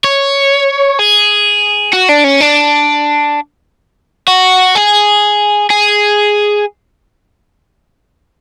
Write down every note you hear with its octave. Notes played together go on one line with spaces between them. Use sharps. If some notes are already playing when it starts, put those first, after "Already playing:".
C#5
G#4
F#4
D4
C#4
D4
F#4
G#4
G#4